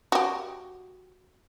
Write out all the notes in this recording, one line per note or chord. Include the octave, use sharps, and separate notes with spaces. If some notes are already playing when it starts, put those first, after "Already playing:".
F#4 G4